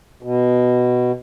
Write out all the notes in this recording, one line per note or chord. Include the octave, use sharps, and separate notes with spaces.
B2